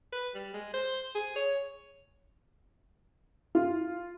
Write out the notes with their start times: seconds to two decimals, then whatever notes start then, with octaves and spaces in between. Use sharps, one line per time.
0.13 B4
0.35 G3
0.54 G#3
0.74 C5
1.15 G#4
1.36 C#5
3.55 F4